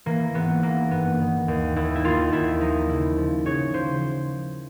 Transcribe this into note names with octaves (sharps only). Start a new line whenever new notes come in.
E3 A#3
G#1 B3
E3 A#3
G2 B3
D#3
D#2
D#2 E4
E4
D#2 F4
D#2 E4
F3 D#4
C#3 E4
F3
C#3 C#5
F3 C5